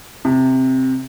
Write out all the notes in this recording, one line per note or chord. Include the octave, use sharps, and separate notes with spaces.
C3